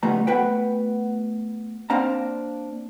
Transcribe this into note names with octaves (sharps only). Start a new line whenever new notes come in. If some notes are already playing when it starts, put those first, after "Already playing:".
C#2 G3 A3 B3 A#5
A3 B3 F#4 B4 G5
A#3 C4 D4 F5 A#5